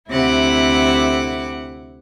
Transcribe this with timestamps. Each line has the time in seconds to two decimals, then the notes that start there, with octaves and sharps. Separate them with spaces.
0.11 D2 C3 E4 F#5 D6